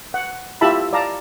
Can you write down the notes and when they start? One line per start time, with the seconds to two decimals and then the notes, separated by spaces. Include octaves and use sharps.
0.14 F#5
0.61 E4 F4 G4 E5 A5 B5
0.93 D5 F5 A5 A#5